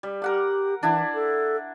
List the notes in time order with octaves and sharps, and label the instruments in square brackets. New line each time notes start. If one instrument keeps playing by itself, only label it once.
[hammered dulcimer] G3
[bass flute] G4 [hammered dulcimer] A#4 F#5 D6
[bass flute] E3 [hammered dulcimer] D4 E4 F#5
[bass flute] A4